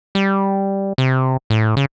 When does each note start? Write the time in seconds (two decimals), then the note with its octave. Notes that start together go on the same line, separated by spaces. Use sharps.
0.15 G3
0.98 C3
1.50 A2
1.77 C#3